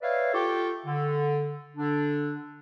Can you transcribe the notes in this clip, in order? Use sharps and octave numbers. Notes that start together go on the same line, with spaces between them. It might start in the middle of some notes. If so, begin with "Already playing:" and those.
B4 C#5 D5 E5 F5
F4 G4 A4 G5 C#6 D6
D3
D3 D4